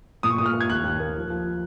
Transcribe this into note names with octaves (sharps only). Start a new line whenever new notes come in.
A#2 D#6
C#6
A#2 D#6
F6
A#3
G#6
D#2 F#6
D#2
A#3
F3
F3